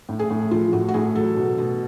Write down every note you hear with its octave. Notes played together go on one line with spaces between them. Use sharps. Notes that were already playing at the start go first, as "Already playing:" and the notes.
A2
G#4
A2
F3 F4
A2 F#4
F#4
A2 G#4
F#3 A4
B2
B2